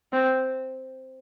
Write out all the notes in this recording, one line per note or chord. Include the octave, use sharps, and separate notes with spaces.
C4